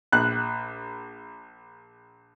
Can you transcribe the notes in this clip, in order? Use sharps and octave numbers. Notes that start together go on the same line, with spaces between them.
A#1 F#6